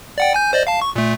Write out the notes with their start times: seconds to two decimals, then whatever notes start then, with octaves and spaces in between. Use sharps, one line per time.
0.18 D5 F#5 G5
0.34 G#5 G6
0.53 C5 D5 D#5
0.67 F5 A5
0.82 C#6
0.96 A#2 A3